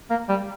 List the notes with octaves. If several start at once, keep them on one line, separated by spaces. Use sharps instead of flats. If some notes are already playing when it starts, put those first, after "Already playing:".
A#3
G3